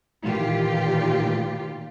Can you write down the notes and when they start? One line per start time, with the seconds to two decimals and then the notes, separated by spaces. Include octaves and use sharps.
0.23 A#2 D#3 E3 F4 G4